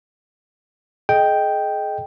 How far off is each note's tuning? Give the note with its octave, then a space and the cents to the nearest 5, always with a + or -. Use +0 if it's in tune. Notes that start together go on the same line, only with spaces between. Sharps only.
G#4 +40 D#5 +0 G5 +0